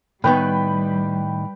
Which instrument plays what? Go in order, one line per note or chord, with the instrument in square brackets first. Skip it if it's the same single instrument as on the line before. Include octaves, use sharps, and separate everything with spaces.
[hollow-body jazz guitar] A2 D#3 B3 [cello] G3 [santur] B4 G5 B5